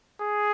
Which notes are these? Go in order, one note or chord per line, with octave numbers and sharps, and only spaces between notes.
G#4